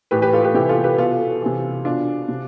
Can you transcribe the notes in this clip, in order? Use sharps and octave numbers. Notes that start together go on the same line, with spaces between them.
A2 E3 G4 B4
G4 B4
F4 A4
G4 B4
C3 E3 E4 G4
F4 A4
G4 B4
B2 F4 A4
C3 E3
B2 D4 F4
C3